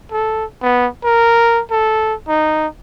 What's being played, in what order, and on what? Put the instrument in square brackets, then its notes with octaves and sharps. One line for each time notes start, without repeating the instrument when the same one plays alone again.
[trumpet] A4
B3
A#4
A4
D#4